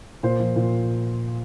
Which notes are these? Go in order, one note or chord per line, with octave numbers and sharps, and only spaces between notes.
A#2 C5
F3
A#2